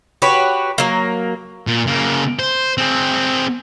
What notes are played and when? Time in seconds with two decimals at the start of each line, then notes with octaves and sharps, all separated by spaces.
0.22 F#4 G4 B4 C#5
0.78 F#3 A#3
1.67 A#2
1.87 C#3 A#3
2.39 C5
2.78 C4 G#4